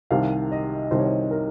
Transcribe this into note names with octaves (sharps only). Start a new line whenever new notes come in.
C2 C3 D#3 F5
D#5
C2 C3 D#3 C5
C#5
C5
A#4